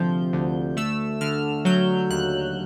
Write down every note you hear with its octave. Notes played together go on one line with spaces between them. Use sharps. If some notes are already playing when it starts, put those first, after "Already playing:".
Already playing: D2 C3 F3 G6
D2
A3 E6
D3 F6
F#3 G6
D#2 F#6